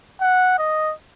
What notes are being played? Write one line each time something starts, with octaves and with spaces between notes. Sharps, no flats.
F#5
D#5